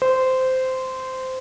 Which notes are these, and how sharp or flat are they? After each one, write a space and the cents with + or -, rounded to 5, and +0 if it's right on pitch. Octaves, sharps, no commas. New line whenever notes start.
C5 -15